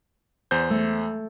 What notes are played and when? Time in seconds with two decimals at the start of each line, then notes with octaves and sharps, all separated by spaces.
0.51 E2 C5 G6
0.70 A3